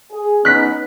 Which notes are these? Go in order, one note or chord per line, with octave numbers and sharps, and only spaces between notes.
G#4
B3 C#4 D#4 F#6 B6